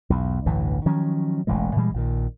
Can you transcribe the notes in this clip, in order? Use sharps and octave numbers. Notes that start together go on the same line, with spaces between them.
B1 E2
A1 D2 G2 E3
D#3 F3 F#3 C#4
E1 A1 E3 G#3
A#2 E3 G3 G#3
A#1 A#2 D#3